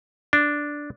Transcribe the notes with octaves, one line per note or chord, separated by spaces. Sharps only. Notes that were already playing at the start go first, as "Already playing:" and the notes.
D4